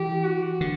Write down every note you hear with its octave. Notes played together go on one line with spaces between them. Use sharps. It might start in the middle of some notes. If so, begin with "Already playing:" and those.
Already playing: E3 G4
F#4
D3